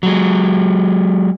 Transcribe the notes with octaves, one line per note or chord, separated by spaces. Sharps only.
F#3 G#3